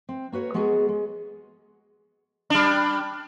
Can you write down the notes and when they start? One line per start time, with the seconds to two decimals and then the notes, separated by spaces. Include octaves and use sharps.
0.09 C4
0.32 A#3 F#4 B4 C#5
0.54 G#3 B3 F#4 G#4 A#4
0.89 G#3
2.50 G3 D4